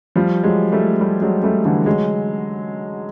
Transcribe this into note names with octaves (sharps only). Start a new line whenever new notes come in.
F3 G3
F#3 G#3
G3 A3
G3 A3
F#3 G#3
G3 A3
D3 E3
F#3 G#3